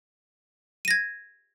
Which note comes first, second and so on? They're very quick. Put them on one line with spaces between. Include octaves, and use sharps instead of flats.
D#7 A#6 G#6